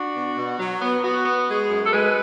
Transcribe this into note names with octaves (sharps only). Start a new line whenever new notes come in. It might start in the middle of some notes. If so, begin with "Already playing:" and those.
Already playing: D4 F#4
B2
B2
F#3
B3
B3 F#4
B3
G#3 G#4
F#2
A4
G#3 B4